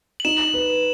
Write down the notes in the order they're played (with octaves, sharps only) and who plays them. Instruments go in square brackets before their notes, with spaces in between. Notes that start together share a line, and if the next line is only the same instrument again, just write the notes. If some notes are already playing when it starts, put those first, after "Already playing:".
[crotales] F#7
[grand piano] D#4 [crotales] E7
[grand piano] B4